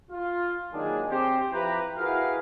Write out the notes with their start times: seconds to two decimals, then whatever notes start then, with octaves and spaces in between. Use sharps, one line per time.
0.11 F4
0.73 D#3 F#3 G#3 A#3 D4 G#4
1.09 C4 G4 C5
1.52 F3 E4 G4 B4 A#5
1.97 E4 F#4 G#4 A#4 B4 F5